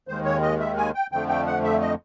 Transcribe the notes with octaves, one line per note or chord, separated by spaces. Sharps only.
D#2 D#3 G#3 C5
C#5
D#5
E5
G#5
G5
F2 D3 F3 A3 G5
G5
F#5
E5
D#5